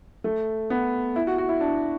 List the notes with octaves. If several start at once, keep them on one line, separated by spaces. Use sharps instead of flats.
A3
B3
E4
F#4
F#4
E4
D4